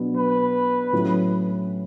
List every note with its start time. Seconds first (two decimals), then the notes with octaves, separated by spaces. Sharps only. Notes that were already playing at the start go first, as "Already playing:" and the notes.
Already playing: B2 F#3 B3 D4
0.17 B4
0.92 A2 F#3 C#4